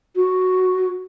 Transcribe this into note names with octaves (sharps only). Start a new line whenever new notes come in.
F#4